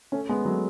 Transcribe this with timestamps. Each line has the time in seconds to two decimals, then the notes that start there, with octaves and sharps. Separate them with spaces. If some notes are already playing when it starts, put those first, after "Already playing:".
0.12 A3 C#4
0.29 G#3 B3
0.45 F#3 A3